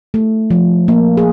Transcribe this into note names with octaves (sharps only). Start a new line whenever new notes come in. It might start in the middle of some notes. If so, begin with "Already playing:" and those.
A3
F3
A#3
G#4